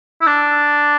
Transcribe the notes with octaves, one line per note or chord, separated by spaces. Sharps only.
E4
D4